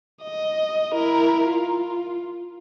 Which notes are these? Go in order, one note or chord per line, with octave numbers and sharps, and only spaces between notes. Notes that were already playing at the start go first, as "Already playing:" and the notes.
D#5
E4 A#4
F4